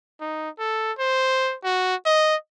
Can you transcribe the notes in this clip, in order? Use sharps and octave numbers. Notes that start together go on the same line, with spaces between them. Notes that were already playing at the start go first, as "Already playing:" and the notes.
D#4
A4
C5
F#4
D#5